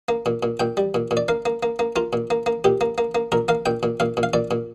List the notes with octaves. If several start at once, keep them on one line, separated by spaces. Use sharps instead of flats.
A#3
A#2
A#2
A#2 G5
G3
A#2
A#2
D5
A#3 F5
A#3
A#3
A#3
A#3 F4
A#2
A#3
A#3
A#2 G4
A#3
A#3
A#3
A#2 A#4
A#3 F5
A#2 G5
A#2
A#2 F5
A#2
F5
A#2 D5
A#2